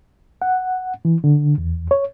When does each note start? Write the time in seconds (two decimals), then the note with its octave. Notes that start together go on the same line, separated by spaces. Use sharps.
0.42 F#5
1.05 E3
1.24 D3
1.58 E2
1.91 C#5